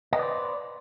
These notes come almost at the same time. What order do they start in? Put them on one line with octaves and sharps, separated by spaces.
D#5 B4 D5 C5